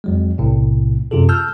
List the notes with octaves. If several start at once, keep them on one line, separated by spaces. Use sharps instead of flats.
F2 F#3 G#3
B1 A2 C3
F#2 C3 F4 G#4 A4
A5 E6 F6 G6